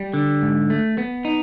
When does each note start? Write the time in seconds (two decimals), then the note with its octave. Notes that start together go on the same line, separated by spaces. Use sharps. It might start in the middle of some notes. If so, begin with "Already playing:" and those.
Already playing: G3
0.14 D3
0.42 G#2
0.70 A3
0.98 B3
1.25 D#4